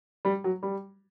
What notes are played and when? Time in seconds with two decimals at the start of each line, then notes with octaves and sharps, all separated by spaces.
0.25 G3
0.44 F#3
0.63 G3